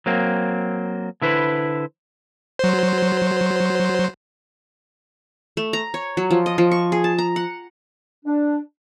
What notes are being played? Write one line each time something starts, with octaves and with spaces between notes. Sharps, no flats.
F#3 A#3 C4
D3 E4 B4 C5
F#3 C5
A3
A#5
C#5
F#3
F3
D#5
F3
C#6
G#4
A5
A#5
F#5
D4